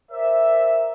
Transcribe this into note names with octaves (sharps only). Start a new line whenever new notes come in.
A#4 C5 D5 E5